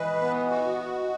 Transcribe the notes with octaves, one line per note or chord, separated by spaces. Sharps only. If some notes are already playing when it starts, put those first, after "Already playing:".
Already playing: E3 B4 D#5
B3
F#4